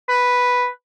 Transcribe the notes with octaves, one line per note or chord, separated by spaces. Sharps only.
B4